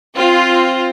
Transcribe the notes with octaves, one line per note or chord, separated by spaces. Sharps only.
C4 F4